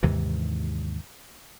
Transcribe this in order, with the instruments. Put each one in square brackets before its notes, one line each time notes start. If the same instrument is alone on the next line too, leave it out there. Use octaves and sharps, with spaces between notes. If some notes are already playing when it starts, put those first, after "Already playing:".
[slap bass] D#2 G#2 C3 E3